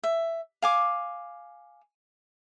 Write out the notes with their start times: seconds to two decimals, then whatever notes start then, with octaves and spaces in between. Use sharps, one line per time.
0.03 E5
0.62 F5 G#5 D6